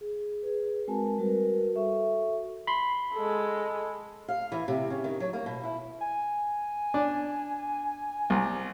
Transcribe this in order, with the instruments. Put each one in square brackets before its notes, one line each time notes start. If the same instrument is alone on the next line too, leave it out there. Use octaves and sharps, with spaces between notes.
[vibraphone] G#4
G#4 B4
G#3 C4 F#4 A#4 G#5 A5
G3 F#4 A#4 B4
F#4 A4 E5 C#6
[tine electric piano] B5 C6
[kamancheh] G#3 A4
[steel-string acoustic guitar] F5
E3
C3
C#3
D#3
F#3
A#3
B2
E4
[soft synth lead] G#5
[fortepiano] D4
C2